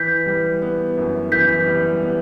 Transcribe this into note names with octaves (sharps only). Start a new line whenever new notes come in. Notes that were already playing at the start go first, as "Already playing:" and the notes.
Already playing: E3 G6 B6
G3
B3
F#2
E3 G6 B6
G3
B3